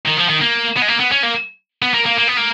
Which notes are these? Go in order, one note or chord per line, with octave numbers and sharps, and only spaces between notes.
D#3
F3
D#3
A#3
B3
G#3
A#3
B3
C#4
A#3
B3
A#3
A#3
A#3
B3
A#3